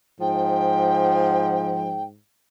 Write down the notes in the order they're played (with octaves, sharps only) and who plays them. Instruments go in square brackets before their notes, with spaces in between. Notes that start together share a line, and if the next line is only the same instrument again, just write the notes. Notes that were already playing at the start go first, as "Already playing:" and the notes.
[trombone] G#2 [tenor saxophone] F3 [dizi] G5